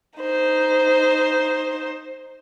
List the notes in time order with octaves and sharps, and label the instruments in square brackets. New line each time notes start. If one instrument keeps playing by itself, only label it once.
[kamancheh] D#4 C5